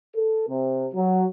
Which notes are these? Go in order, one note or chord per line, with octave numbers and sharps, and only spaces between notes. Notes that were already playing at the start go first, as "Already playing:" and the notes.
A4
C3
F#3